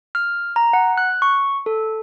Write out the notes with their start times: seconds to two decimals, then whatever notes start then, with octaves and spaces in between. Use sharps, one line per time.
0.15 F6
0.56 A#5
0.73 F#5
0.98 F#6
1.22 C#6
1.66 A4